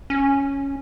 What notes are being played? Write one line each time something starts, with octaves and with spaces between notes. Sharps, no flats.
C#4